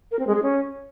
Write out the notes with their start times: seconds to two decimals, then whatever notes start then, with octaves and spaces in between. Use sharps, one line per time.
0.11 A#4
0.19 C4
0.27 G#3
0.35 G#4
0.43 C#4